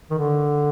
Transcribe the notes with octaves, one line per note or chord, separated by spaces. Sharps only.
D#3
D3